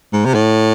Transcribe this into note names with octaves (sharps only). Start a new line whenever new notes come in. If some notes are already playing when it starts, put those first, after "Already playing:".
G#2
C3
A2